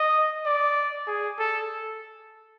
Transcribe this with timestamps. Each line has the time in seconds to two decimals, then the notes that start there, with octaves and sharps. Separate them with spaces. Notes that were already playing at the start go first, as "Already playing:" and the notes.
Already playing: D#5
0.46 D5
1.07 G#4
1.39 A4